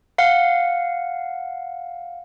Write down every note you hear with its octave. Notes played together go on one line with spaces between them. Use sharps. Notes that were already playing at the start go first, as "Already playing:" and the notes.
F5 F#5